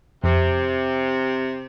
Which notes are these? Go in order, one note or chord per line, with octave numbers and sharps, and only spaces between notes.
F2 C3